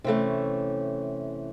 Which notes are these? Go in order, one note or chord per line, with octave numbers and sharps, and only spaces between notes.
C3 E3 A3 C#4